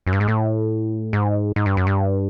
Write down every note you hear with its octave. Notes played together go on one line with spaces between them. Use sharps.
F#2
G2
G#2
A2
G#2
G#2
G2
F#2
G2